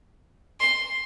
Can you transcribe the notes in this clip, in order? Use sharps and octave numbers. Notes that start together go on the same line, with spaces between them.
C6